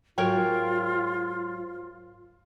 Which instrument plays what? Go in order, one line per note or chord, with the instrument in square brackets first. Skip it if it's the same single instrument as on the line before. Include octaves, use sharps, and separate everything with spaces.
[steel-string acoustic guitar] G#2 F#3 [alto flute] F4 [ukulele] A#4 C#5 G5